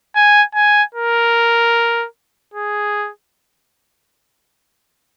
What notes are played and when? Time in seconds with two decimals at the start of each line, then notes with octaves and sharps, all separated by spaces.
0.16 G#5
0.55 G#5
0.95 A#4
2.54 G#4